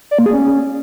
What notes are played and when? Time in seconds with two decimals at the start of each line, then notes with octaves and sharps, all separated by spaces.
0.11 D5
0.19 A#3
0.26 G#4
0.33 C#4